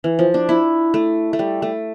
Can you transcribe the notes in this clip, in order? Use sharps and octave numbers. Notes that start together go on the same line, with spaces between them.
E3
F3
D4
E4
A3
A3
G3
A3